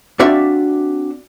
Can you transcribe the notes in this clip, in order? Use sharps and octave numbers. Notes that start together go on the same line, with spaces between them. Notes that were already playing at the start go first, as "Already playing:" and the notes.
C4 D4 F#4 D5 E5 F5